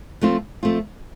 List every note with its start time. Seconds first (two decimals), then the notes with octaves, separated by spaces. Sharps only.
0.21 F3 A3 C4 F4
0.63 F3 A3 C4 F4